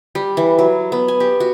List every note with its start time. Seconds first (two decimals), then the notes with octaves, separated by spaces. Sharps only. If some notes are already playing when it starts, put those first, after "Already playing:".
0.15 G3
0.37 E3
0.59 F#3
0.92 B3
1.08 G#5
1.20 G4
1.40 F#4